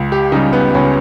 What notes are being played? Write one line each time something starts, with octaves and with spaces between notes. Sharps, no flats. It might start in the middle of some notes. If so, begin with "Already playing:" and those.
Already playing: C#2
G4
C#3 G3 D#4
B3
C#2 C#4